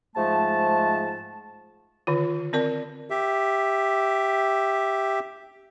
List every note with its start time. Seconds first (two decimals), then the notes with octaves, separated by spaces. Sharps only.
0.15 G#2 F3 G#3 A3 A5
2.07 D3 D#3 F4
2.53 C4 A#4 D5
3.10 G4 E5